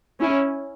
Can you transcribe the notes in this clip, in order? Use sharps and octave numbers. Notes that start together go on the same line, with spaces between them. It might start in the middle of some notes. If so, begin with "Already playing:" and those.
C#4 E4